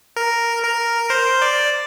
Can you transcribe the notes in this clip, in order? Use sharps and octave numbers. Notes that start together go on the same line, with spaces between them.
A#4
A#4
C5
D5